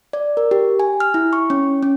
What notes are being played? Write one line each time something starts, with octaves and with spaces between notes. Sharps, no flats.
D5
A#4
G4
G#5
F6
E4
C#6
C#4
C#4